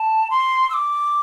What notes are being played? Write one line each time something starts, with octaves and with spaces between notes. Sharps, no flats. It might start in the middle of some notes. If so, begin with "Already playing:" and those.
Already playing: A5
C6
E6
D6